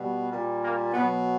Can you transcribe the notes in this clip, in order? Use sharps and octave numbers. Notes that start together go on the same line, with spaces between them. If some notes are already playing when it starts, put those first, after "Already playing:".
Already playing: B2 G3
A#2 G3
A#3
B2 F#3 B3